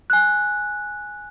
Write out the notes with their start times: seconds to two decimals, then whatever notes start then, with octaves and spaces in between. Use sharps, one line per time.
0.10 G#5 F#6